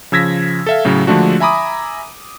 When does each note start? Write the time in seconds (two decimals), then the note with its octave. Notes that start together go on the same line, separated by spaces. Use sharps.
0.12 C#3 F3 E6 G#6 A#6 B6
0.67 A4 E5 F5
0.85 A2 C#3 F#3
1.07 D3 F3 G#3 A3 D4 F#4
1.40 E5 G#5 A#5 B5 D6 D#6